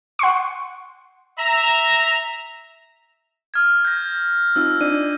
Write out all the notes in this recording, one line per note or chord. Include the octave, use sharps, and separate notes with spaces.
F#5 C6 C#6
E5 A#5
D#6 F6 G#6
G6 A#6
C4 D#4 F4 E6
D4 D5 D#7